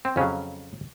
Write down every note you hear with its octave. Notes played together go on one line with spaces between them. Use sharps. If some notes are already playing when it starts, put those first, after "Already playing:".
C4
F2 C#3 F#3 C#4